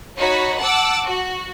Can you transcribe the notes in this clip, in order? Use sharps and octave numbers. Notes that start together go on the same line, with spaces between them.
D#4 F#4 C#5 B5
F#5 A5 D6 E6
F#4